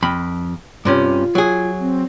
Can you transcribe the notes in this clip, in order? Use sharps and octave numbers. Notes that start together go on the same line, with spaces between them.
F2 B5
G2 C3 C#4 F4
F#3 G#4
C4